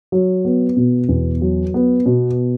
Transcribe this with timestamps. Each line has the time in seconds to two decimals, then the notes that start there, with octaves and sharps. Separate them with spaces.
0.12 F#3
0.45 B3
0.77 B2
1.09 E2
1.41 F#3
1.74 B3
2.06 B2